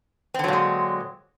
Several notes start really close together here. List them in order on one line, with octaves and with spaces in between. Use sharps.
C4 D3 F#3 A#2 G#3